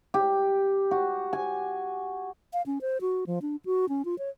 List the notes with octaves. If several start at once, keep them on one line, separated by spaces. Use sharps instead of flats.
G4
F#4
G#5
F5
C#4
C5
F#4
F3
D4
F#4
C#4
F4
C#5